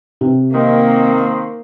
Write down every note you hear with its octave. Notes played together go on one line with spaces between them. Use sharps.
C3
D#3 A#3 C4